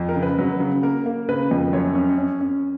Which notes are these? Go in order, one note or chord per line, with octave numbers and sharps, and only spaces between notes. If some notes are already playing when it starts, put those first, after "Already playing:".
Already playing: F2
A#4
C#3
B4
F#3 B4
C#3
A#3 A#4
A#3
C#3 B4
F2
F#2 C#5
C#4
C#4
C#4